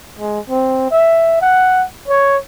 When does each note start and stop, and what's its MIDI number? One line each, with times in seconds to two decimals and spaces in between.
0.19 0.40 56
0.50 0.87 60
0.91 1.41 76
1.42 1.84 78
2.08 2.38 73